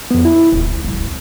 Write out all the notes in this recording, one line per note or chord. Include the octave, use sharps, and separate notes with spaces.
F2 B3
E4
D#1 C#2
A2 F#3
A#3 C4